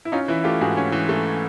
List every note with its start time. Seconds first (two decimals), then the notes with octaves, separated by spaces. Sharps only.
0.05 E4
0.12 C#4 D#4 F4
0.28 E3 E4
0.44 A3 F4 G4
0.61 G#2 F#4 G#4
0.77 C#4
0.92 E3
1.09 A3